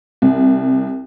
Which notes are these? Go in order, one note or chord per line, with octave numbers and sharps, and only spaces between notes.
C2